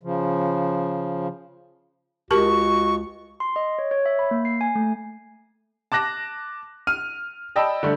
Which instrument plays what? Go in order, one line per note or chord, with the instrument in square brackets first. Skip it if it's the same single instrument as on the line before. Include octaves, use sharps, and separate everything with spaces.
[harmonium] C#3 F3
[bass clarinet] C#2 [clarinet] F#4 [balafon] G4 A#4 A5 [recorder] C#6
[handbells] C6
D#5
C#5
C#5
E5
B5
A#3
C7
G#5
A3
[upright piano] A5 D6 F#6 A#6
F6 D#7
D5 D#5 G5 A5 B5 E6
D3 G3 A3 A4